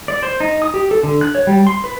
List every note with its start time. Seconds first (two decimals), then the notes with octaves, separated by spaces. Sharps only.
0.08 D5
0.23 C5
0.40 D#4
0.62 D#6
0.74 G4
0.91 A4
1.03 D3
1.21 F#6
1.35 C#5
1.47 G3
1.67 C6
1.84 B4